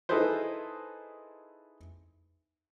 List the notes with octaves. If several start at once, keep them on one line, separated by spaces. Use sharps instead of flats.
D#4 E4 G#4 A4 B4 C5